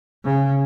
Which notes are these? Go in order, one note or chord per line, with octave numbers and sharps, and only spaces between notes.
C#3